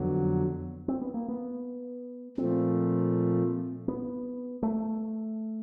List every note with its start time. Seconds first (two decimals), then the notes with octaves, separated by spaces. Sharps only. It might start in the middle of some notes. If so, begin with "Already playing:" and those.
Already playing: F2 D3 F#3 B3
0.88 C4
1.02 B3
1.14 A#3
1.28 B3
2.38 A#2 F3 A3 C4
3.88 B3
4.63 A3